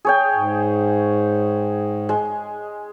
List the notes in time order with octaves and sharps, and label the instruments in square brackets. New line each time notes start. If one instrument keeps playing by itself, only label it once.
[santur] G#4 C#5 G5
[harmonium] G#2
[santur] G#3